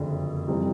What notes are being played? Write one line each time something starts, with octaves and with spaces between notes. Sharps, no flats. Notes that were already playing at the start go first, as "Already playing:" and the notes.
Already playing: F#1 F2 D3
F2 C3 E3 G3